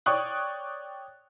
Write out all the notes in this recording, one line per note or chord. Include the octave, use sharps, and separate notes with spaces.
C#5 D5 G5 C#6 D#6 F#6